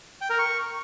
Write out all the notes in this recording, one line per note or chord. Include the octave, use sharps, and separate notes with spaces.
G5
A#4
C#6